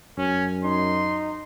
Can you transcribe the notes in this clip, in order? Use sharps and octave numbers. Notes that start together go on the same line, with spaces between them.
F#2 C#4
D#4 C6